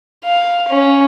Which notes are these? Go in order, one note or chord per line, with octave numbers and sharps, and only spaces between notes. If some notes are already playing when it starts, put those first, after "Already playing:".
F5
C#4